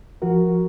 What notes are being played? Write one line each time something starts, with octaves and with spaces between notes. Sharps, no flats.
F3 F#4 A#4